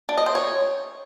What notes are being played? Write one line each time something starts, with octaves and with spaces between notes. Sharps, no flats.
D4
D#5
C5
C#5